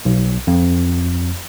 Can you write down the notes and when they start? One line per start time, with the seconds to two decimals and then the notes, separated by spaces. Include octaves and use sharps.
0.05 B1
0.47 F2